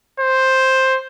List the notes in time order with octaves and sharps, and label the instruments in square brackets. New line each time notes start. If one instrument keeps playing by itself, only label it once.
[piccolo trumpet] C5